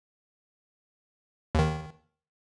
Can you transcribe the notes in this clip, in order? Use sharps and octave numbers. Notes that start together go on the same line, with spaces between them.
D#2 D#3